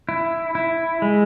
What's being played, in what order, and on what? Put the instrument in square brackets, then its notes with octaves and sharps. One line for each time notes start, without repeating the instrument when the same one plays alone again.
[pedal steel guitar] E4
E4
G#3